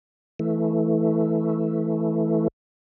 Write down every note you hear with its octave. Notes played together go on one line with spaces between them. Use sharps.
E3 A3